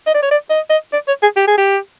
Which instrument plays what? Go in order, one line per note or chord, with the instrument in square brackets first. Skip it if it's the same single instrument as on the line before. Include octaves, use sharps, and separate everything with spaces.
[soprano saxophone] D#5
D5
C#5
D5
D#5
D#5
D5
C#5
G#4
G4
G#4
G4